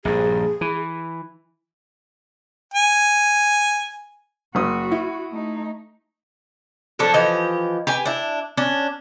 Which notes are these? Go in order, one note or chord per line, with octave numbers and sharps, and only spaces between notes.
A#1 G2 G#4
E3
G#5
F#1 F#4 D#6
E4
A3 D#4
F3 F#3 D4 A4
E3 F3 G4 D#5
G4 B4 G#5
D4 E4
C#4 D4